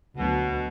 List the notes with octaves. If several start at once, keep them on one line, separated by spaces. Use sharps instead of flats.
D2 B2 D3 F#3 B3